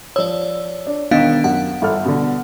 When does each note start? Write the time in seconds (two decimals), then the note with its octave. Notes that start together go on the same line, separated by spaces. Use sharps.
0.16 F3 C#5 D5 E6
0.87 D4
1.11 E1 D#3 B3 D4 D#5 F5
1.44 F#2 F#5
1.82 G1 A4 F6
2.05 B2 D3